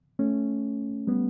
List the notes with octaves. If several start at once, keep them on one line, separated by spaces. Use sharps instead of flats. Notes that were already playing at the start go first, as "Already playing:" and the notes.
A3 C#4
G3 B3